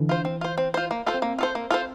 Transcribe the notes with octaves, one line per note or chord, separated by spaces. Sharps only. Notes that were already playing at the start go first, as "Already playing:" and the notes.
Already playing: D3 E3
F4 C5
C4
F4 C5
C4
F4 C5
A#3
F4 A4 C5
C4
A#3
F4 A4 C5
A#3
F4 A4 C5